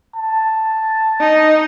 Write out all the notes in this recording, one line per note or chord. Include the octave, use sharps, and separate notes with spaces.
A5
D#4